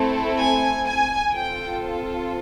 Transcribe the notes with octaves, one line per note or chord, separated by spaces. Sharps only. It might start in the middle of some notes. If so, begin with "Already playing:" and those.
Already playing: A3 C4 E4 A4
G#5
G#5
C4 F4 A4 G5